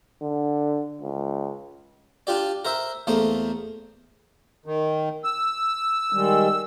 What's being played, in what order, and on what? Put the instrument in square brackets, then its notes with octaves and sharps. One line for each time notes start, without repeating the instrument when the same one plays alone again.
[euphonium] D3
C#2
[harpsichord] D4 F4 G4 D5
A#4 C5 E5
E2 A3 A#3 C5
[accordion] D#3
E6
[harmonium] D#3 G3 G#3